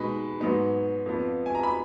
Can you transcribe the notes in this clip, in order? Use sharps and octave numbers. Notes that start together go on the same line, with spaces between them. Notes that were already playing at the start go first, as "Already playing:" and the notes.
Already playing: B2 G#3 D#4 B4 B5
G#2 F#3 B3 D#4
F2 F3 B3
G#5
A#5
B5